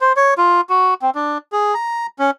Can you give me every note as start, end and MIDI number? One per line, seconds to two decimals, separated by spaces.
0.01 0.13 72
0.16 0.34 73
0.38 0.61 65
0.69 0.94 66
1.02 1.10 60
1.15 1.38 62
1.52 1.74 68
1.75 2.07 82
2.19 2.31 61